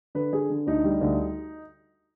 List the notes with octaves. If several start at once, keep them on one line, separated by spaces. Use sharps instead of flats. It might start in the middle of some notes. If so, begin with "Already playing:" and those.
D3 B4
D3 G#4
D3
D2 D#4
G3
D2